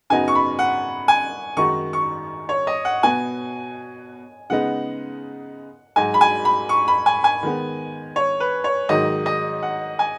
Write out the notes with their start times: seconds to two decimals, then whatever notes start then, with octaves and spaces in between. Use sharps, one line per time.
0.10 F#2 C#3 B3 D#4 F#4 G#5
0.28 C#6
0.35 B5
0.59 F#5
1.08 G#5
1.57 F#2 D#3 G#3 D#4 F#4 C#6
1.93 C#6
2.49 C#5
2.67 D#5
2.85 F#5
3.03 B2 B3 F#4 G#5
4.50 C#3 G#3 B3 D#4 F#5
5.96 G#2 F#3 D#4 F#4 G#5
6.14 B5
6.21 G#5
6.45 B5
6.69 C#6
6.88 B5
7.06 G#5
7.24 G#5
7.43 D#3 G#3 B3
8.16 C#5
8.40 B4
8.64 C#5
8.89 G#2 D#3 F#3 D#4 D#5
9.26 D#5
9.62 F#5
9.99 G#5